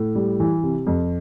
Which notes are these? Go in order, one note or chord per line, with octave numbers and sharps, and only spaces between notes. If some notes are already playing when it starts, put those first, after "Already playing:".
Already playing: A2
G3
E3
C3
F2